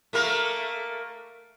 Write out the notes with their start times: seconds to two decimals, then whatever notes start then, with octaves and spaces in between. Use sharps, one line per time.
0.13 A3 A#3 A#4